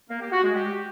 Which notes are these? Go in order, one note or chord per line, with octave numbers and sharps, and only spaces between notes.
A#3
G4
F#4
G#3
G4